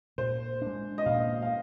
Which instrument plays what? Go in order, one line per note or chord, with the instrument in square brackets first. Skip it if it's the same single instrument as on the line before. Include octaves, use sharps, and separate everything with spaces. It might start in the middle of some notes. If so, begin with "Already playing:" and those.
[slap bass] A#2 [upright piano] C5
[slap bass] G#3 D4
[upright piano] D#5
[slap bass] A#2 [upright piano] F5
[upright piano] F5